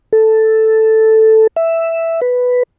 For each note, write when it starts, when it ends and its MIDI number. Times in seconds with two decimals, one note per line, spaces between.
0.13 1.47 69
1.56 2.20 76
2.21 2.63 71